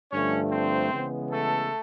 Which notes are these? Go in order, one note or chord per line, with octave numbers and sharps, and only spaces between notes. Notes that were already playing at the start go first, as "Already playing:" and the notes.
G2 D3 F3 A3 C#4 C#5
C4 C5
C#3 E3 G#3 B3
A3 A4